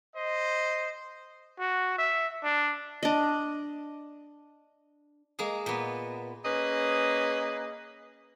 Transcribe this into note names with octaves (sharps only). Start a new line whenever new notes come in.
C5 D#5
F#4
E5
D4
D4 D#5
G#3 A#3 G#4
A#2 B3
A#3 C#4 G#4 B4 D#5